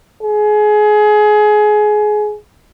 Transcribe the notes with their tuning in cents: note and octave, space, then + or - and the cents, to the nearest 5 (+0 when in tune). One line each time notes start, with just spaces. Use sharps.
G#4 +25